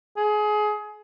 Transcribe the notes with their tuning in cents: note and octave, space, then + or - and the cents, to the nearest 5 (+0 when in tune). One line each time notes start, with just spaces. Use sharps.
G#4 +25